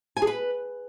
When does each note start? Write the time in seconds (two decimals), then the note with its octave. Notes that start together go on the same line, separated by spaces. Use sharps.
0.17 G#5
0.22 G#4
0.27 B4